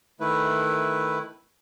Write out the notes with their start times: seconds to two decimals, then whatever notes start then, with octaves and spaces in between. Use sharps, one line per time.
0.20 D#3 A3 E4 B4